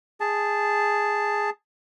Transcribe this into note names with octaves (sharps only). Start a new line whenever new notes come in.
G#4 A5